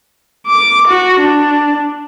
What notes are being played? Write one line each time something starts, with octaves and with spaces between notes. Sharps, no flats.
D6
F#4
D4